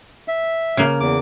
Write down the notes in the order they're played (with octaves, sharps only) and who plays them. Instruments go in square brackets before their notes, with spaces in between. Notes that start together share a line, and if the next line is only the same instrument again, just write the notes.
[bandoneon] E5
[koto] C#3 A#3
[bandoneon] E2 D6